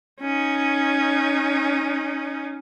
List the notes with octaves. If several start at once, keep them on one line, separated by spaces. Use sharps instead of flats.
C#4 D#4